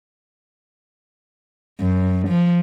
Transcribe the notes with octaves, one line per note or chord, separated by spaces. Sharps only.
F#2
F3